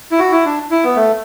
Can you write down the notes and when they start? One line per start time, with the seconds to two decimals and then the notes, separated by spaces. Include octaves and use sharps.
0.11 E4
0.19 F#4
0.32 E4
0.46 D4
0.71 E4
0.84 B3
0.96 A3